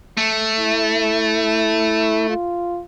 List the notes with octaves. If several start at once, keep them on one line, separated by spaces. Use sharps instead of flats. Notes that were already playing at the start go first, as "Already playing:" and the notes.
A3
E4
F4